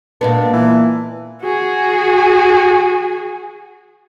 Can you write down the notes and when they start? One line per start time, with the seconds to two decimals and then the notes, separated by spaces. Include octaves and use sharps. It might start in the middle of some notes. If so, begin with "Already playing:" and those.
0.21 A#2 G#3 B3 D4
0.53 E3
1.42 F#4 G#4